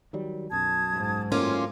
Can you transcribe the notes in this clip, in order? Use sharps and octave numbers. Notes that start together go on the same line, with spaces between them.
D#3 F#3 G3
B1 F#2 A5 D#6 G#6
G#2
F#2 A2 D#3 A#3 C#4 F4 C6 D6